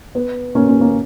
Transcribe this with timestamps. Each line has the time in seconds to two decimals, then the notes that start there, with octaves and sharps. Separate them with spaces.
0.15 B3
0.55 A#3 C#4
0.68 A#3 C#4
0.81 A#3 C#4